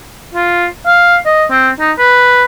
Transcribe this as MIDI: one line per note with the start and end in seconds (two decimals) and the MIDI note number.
0.34 0.66 65
0.86 1.16 77
1.26 1.45 75
1.50 1.69 60
1.80 1.91 63
1.98 2.45 71